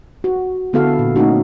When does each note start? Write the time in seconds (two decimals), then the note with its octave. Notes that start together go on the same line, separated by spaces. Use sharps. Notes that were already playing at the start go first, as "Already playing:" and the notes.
0.24 F#4
0.73 D3 B3 E4 F#4 A4 F5
0.99 A#2
1.16 A3 C4 C#4 D#4 F#4